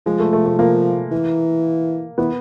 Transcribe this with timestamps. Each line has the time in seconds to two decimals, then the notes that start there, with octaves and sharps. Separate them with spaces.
0.06 F3 G#3
0.19 A3
0.33 A3
0.46 A3
0.58 F3 A#3
1.11 E3
2.18 E3 B3